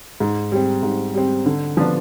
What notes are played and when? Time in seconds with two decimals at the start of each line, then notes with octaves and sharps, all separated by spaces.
0.20 G#2
0.52 G3 C4
0.83 G#2
1.14 G3 C4
1.46 D3
1.77 F3 B3 D4